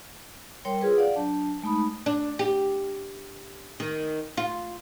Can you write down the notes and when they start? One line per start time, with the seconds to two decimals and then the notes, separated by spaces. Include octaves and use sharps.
0.65 G3 A#4 C#5 G5 C6
0.81 F4 G#4 B4
0.97 D5 F5 F#5
1.16 F#3 D4 A5
1.62 G#3 A3 D#4 B5 D#6
2.06 D4
2.39 G4
3.80 D#3
4.37 F4